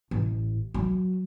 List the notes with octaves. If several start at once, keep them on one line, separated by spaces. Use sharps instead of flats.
A1
F#3